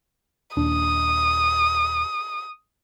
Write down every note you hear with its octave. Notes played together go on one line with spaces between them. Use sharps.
D#1 D4 D#6